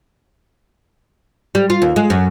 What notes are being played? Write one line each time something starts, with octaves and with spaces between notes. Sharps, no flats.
G3
F4
D#2
G#3
F#2